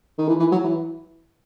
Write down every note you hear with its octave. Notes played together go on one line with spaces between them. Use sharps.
D#3
E3
E3
F#3
E3